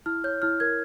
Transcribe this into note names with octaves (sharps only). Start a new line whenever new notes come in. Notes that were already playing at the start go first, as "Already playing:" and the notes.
E4 F6
C#5 G6
E4 F6
A#4 G#6